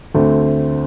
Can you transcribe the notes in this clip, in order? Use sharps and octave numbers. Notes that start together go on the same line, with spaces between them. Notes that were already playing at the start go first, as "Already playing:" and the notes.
D2 D3 A3 C4